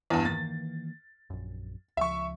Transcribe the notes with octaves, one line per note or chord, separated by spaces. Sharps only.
E2 G2
D#3 E3 A#3 A6
A#1 F#2
C#2 F3 E5 C#6